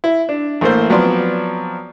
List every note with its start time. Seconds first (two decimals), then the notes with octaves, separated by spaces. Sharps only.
0.04 E4
0.29 D4
0.61 A1 A3 A#3 C5
0.90 F3 F#3 B3 C4 D5 C6